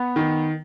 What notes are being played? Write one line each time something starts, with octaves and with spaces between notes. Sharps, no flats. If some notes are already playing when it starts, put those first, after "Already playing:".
Already playing: B3
D#3